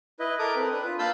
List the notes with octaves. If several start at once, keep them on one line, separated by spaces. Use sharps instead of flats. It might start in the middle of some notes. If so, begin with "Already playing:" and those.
E4 B4 D#5
A4 A#4 D6 D#6
C4 B4
D4 B4
F4
A#3 F5 A5 B5 E6 G6